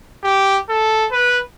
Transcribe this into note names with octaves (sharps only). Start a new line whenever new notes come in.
G4
A4
B4